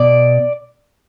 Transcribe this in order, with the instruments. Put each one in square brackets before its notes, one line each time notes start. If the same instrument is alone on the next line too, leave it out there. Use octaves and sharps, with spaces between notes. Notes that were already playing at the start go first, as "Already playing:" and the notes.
Already playing: [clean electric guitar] B2 D5